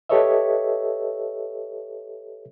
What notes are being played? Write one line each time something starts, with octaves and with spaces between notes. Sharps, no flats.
G4 A4 B4 C#5 D#5 E5